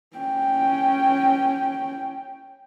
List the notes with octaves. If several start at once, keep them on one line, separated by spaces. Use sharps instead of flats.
C#4 G5